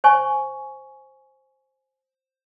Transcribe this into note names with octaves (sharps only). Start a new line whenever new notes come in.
C5 G#5 C#6